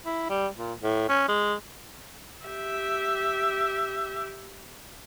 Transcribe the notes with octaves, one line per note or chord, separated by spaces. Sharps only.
E4
G3
A#2
A2
C#4
G#3
G4 E5